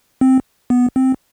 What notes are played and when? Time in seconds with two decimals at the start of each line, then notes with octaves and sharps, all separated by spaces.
0.21 C4
0.70 B3
0.96 C4